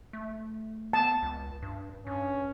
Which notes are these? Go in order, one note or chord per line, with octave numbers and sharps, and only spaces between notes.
A3
B3 A5
C#2
G2
G2 C#4